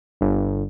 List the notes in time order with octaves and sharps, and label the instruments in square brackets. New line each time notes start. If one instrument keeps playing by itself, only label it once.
[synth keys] G1